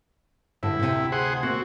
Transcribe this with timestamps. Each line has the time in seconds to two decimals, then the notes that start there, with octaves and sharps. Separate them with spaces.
0.63 G2 D3 E4
0.79 D2 C3
1.12 G#4 C5 F#5
1.43 A#3 C4 F#4